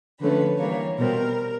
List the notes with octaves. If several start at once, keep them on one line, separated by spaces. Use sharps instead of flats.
D3 F3 A3 C#4 B4
E3 G3 A#3 C#5
B2 G3 C4 A#4